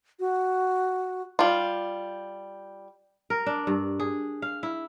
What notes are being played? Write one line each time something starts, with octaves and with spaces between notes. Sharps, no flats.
F#4
G3 F4
A#4
D4
G2
G#4
F5
E4